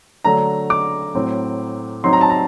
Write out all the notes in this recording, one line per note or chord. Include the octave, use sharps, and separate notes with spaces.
D3 F#3 A3 D4 A#5
D6
A2 F#3 C4
F#3 C4 D#4 C6
A#5
A5
A#5